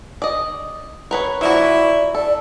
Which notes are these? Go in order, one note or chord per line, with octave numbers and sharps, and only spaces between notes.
D5 D#5
A#4 B4 C#5
F3 A#3 E4 F#4 D5
A4 D5